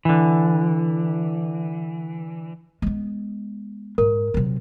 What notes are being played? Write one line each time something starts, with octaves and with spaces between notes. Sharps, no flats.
D3 E3
G#3 B3
G#2 A#4
C3 F#3